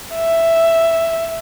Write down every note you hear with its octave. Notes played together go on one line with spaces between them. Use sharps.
E5